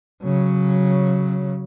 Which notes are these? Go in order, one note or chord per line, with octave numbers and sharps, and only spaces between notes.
C#3 F#3